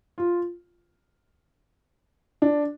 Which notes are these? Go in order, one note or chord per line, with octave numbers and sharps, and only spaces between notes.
F4
D4